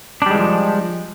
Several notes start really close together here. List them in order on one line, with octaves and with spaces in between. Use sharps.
D4 G3 G#3 E3 F3